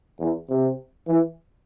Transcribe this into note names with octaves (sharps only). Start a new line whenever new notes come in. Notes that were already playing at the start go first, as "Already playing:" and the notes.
E2
C3
E3